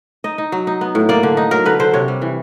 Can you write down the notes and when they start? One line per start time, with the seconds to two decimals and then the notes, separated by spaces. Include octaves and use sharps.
0.24 D#4 D#5
0.38 D#4
0.52 F#3
0.67 D#4
0.81 B3
0.95 A2
1.09 A#3 D5
1.23 D3
1.37 D#4
1.51 F#3 A#4
1.65 D3 B4
1.80 D3 C5
1.93 C3 C#5
2.08 G3
2.22 E3